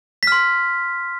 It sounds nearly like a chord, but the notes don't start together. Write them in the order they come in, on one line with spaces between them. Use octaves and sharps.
B6 F6 C6